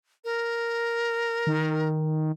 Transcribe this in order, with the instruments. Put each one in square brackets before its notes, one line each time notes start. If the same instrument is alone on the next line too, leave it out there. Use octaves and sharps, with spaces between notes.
[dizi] A#4
[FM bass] D#3